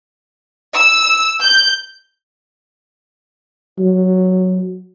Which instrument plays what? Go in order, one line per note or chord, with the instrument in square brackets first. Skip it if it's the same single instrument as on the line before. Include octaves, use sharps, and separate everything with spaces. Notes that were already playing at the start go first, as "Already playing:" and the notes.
[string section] E6
G6
[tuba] F#3